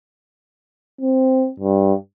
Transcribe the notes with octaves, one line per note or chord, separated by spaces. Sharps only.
C4
G2